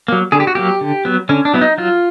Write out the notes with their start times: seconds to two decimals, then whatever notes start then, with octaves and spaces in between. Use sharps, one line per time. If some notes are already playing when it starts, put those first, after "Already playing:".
0.08 F#3 A#3
0.32 D3 G#4
0.40 G4
0.47 F#4
0.55 F#3 A#3 G4
0.81 D3
1.05 F#3 B3
1.29 D3 C#4
1.45 D4
1.53 F#3 B3 E4
1.61 D#4
1.78 F#3 F4